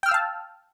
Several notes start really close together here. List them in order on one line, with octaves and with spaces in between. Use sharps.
G5 F6 E6 F5 A5